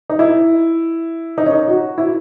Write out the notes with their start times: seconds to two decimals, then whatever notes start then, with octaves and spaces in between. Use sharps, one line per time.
0.10 D#4
0.19 E4
1.38 D#4
1.46 C#4
1.53 D#4
1.68 F#4
1.98 E4